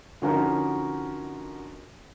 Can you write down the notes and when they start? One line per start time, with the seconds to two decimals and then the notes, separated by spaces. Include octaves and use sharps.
0.22 D3 F3 C#4 D#4 F#4 A#4